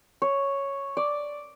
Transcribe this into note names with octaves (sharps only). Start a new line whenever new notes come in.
C#5
D5